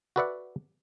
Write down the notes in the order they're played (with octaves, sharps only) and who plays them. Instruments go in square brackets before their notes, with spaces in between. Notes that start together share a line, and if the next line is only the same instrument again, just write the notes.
[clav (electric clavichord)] F#4 A4 B4 D5 E5 F#5